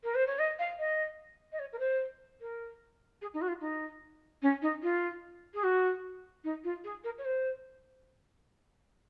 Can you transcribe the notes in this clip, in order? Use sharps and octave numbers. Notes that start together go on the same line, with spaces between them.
A#4
C5
C#5
D#5
F5
D#5
D#5
C#5
A#4
C5
A#4
G#4
D#4
F#4
F4
D#4
C#4
D#4
F4
G#4
F#4
D#4
F4
G#4
A#4
C#5
C5